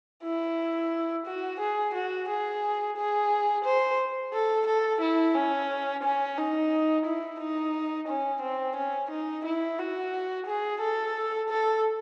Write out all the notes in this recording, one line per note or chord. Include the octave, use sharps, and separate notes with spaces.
E4
F#4
G#4
F#4
G#4
G#4
C5
A4
A4
E4
C#4
C#4
D#4
E4
D#4
C#4
C4
C#4
D#4
E4
F#4
G#4
A4
A4